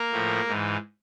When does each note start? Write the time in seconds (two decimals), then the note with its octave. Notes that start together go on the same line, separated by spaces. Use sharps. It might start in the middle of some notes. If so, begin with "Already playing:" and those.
Already playing: A#3 A#4
0.11 A2 F3
0.48 G#2 E3